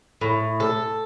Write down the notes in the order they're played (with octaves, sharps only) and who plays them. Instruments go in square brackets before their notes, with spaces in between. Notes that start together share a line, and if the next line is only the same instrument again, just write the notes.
[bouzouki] A2
A4